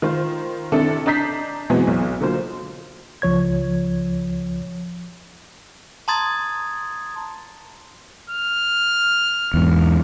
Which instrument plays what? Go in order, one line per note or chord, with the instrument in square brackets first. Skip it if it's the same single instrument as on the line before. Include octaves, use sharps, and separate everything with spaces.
[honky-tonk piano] D#3 F4 C5
C3 D#3 D4 E4 A4
D4 D#5 A#5 G6 B6 C7
B2 E3 F#3 G#3 B3 C4
B1
D3 F#3 A#3 F4 C5
[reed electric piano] C#2 F3 C#5 G#6
[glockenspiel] A5 A#5 C6 D#6 G#6 A6
[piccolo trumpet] F6
[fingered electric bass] E2 G#2